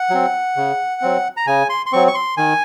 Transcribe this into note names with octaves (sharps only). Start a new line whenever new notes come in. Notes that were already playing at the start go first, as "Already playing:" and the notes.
Already playing: F#5
F#3 C4
C#3
F#3 C4
A#5
C#3 G#5
C6
C6
F#3 C4 C#6
C#6
C6
D#3 G#5